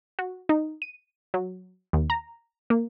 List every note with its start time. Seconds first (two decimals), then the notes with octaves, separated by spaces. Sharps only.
0.19 F#4
0.49 D#4
0.82 D#7
1.34 F#3
1.93 D#2
2.10 A#5
2.70 A#3